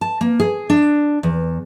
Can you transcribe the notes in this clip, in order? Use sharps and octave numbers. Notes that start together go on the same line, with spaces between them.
A5
A#3
G#4
D4
E2